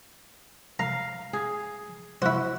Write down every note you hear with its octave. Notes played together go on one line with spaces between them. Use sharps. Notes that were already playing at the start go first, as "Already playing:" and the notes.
F5 A#5
G#4
E4 F#4 C5